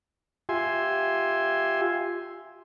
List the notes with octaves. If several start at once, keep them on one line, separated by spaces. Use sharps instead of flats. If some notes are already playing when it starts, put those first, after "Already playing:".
F4 G4 E5 G#5 C6